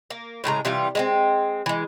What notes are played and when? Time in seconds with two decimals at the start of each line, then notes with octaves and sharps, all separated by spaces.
0.10 A#3
0.44 A2 C#3 G#3 A#5
0.65 C3 E3 G3 F4
0.95 G#3 B3 C4
1.66 E3 G#3